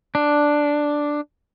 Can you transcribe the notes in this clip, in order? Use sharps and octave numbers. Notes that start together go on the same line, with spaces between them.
D4